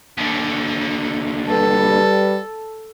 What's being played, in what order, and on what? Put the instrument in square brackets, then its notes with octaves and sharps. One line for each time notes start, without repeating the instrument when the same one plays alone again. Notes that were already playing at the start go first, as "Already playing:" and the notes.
[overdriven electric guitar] D#2 D3
[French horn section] G3 B4 [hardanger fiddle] A4